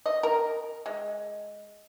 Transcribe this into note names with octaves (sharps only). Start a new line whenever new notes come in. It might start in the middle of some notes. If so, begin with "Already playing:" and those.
D#5
A#4
G#3